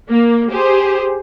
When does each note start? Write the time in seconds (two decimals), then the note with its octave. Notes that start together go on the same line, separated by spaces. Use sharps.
0.11 A#3
0.51 G4 G#4 C5